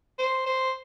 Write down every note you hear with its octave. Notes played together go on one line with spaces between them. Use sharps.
C5
C5